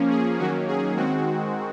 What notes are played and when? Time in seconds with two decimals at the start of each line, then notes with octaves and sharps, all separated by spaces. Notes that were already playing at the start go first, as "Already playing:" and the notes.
Already playing: F3 A#3 C#4
0.10 G#4
0.39 D#3 F#3 A#3 C#4 F#4
0.68 G#4
0.96 D#3 G#3 C4 F#4